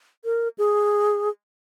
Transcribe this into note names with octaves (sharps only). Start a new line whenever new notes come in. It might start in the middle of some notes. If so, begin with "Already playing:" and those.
A#4
G#4